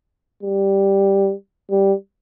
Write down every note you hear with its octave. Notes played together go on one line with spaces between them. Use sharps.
G3
G3